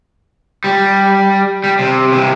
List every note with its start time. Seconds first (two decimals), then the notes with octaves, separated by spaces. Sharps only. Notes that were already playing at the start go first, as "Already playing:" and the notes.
0.64 G3
1.64 G3
1.79 C3
2.12 C3 E3